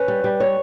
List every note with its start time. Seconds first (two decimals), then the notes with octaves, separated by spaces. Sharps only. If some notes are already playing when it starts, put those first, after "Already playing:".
Already playing: C#4 B4
0.08 G3
0.24 G3
0.40 C#5